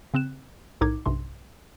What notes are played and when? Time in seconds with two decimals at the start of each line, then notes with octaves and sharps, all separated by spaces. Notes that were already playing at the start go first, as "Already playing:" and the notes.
0.14 C#3 C4 F#6 E7
0.81 B1 A2 D#4 A#4 D6 G#6
1.06 B1 G2 C3 C6